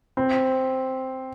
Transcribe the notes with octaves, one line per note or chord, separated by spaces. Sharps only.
C4